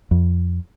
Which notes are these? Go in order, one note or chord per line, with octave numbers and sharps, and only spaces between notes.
F2